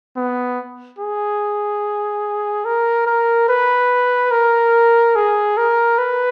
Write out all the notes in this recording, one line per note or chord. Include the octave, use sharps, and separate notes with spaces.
B3
G#4
A#4
A#4
B4
A#4
G#4
A#4
B4